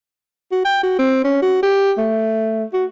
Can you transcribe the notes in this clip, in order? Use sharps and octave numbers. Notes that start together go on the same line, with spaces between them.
F#4
G5
F#4
C4
C#4
F#4
G4
A3
F#4